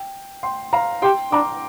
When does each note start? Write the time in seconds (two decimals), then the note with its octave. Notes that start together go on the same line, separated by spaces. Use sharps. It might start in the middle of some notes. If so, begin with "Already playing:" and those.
Already playing: G5
0.43 G5 C6
0.73 F5 A#5
1.02 G4 G5 C6
1.32 D4 A#5 D6